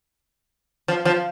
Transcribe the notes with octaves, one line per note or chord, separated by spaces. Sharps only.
F3
F3